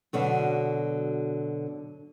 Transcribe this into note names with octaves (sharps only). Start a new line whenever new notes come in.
B2 D3 F#3